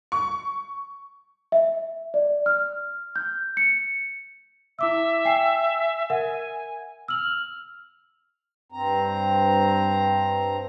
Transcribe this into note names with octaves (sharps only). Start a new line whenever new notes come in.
C#6
E5
D5
F6
G6
C#7
E4 E5 D6 E6
G5 G#5 C7
A#4 E5 F#5 G#5
E6 F6 F#7
G2 C4 A#5